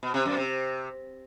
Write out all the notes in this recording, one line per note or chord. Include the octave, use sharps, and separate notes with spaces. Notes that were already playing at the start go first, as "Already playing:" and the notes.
B2
C3
F#2
C3